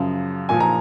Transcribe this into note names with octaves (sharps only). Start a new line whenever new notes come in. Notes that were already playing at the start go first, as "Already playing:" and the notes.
Already playing: F#2 C#3 F3
A#2 F3 G#5
A#5